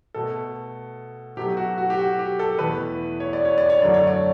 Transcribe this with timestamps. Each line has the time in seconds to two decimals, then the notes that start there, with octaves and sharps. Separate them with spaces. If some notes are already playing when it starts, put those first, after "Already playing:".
0.14 B2 A3 A4
1.37 B2 F#3 A3 G4
1.57 F#4
1.78 F#4
1.90 G4
1.98 F#4
2.19 G4
2.39 A4
2.59 E2 B2 A3 B4
3.20 C#5
3.33 D5
3.45 C#5
3.58 D5
3.70 C#5
3.81 F#2 D3 F#3 A3 D5
3.94 C#5
4.07 D5